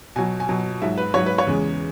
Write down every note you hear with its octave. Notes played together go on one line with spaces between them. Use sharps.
B2 F#3 G#5
G#5
B2 F#3
G#2 F#3 E5
B4
G#2 F#3 C#5
B4
C#5
E2 C#3 G#3